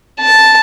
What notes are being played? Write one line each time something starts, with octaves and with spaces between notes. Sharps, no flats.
A5